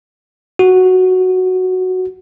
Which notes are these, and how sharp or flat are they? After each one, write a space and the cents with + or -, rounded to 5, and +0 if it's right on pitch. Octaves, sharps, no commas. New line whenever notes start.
F#4 +0